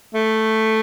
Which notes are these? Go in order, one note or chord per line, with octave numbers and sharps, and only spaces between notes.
A3